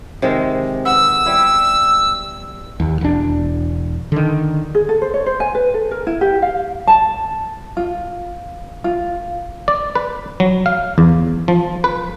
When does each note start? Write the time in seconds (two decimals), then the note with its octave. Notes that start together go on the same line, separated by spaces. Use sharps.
0.22 C3 D#3 G#3
0.85 B3 F#5 E6
1.26 G3 E4
2.80 D#2
3.01 E1 D4
4.12 D3 D#3
4.75 G#4
4.89 A4
5.02 C5
5.14 C#5
5.26 C5
5.40 G#5
5.55 B4
5.74 A4
5.91 A#4
6.07 E4
6.21 G4
6.42 F5
6.87 A5
7.77 F4
8.84 F4
9.68 D5
9.95 B4
10.40 F#3
10.66 F5
10.98 E2
11.48 F3
11.84 B4